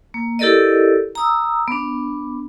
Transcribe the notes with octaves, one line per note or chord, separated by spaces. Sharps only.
A#3
E4 G4 A4 A#4 D5 D#5
A#5 D#6 E6
B3 D4